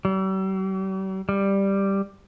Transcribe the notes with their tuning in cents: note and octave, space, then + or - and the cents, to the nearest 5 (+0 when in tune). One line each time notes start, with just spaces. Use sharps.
G3 -45
G3 +5